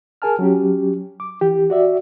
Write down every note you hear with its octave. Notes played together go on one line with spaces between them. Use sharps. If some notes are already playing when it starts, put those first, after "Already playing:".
G#4 A#4 G#5 A5 F6
F#3 C#4 G4
D6
E3 G4
F#4 D5 E5